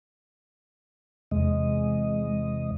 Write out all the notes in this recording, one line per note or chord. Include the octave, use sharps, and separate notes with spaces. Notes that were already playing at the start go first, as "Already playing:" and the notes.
E2 C3 G#3 D#5